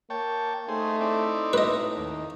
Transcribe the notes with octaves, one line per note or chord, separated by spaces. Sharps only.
A#3 C#5 G5 A5
A3 D#4 G#4 C5
C4 E4 D5
A2 B4 D#5
D#2